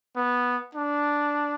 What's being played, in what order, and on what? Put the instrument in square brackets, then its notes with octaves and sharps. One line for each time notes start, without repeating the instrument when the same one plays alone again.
[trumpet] B3
D4